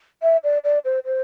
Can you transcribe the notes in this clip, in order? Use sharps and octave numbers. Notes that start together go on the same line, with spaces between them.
E5
D5
D5
C5
C5